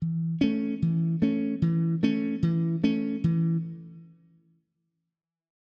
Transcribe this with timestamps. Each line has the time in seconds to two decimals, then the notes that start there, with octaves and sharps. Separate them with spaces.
0.02 E3
0.41 A3 C#4
0.82 E3
1.22 A3 C#4
1.62 E3
2.03 A3 C#4
2.43 E3
2.84 A3 C#4
3.24 E3